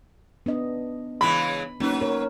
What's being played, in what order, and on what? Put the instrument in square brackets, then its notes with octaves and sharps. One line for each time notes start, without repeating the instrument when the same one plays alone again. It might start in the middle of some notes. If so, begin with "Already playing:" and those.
[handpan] B3 D4 D#5
[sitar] C#3 E3 G#3 [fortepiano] B5
[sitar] F#3 B4 [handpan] A#3 C#4 D#4
[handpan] A#4 C#5